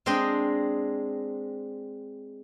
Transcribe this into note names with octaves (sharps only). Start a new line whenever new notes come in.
G#3 C4 D4 D#5 G5